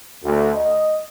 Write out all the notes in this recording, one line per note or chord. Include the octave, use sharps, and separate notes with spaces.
D2
D#5